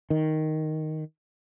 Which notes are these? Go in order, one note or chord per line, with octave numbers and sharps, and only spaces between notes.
D#3